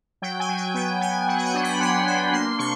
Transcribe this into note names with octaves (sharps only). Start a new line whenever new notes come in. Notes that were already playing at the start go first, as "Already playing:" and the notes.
F#3 G5
G#5
F#3
G5
B3 G5
B3 G#5
F#3 F#5
G5
F#5
D4
B5
B3 C6
D4 B5
A#3 C6
C3 C#6